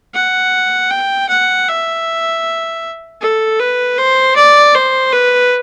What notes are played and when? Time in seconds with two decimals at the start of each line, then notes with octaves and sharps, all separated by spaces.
0.14 F#5
0.91 G5
1.29 F#5
1.68 E5
3.21 A4
3.60 B4
3.98 C5
4.36 D5
4.75 C5
5.13 B4